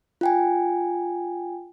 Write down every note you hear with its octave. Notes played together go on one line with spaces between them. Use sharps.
F4 G5 G#5